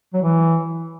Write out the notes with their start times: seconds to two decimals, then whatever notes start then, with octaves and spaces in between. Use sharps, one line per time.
0.14 F#3
0.22 E3